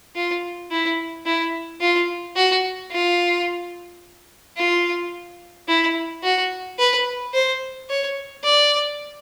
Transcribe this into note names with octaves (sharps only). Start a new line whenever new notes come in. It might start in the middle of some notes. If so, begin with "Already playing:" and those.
F4
E4
E4
F4
F#4
F4
F4
E4
F#4
B4
C5
C#5
D5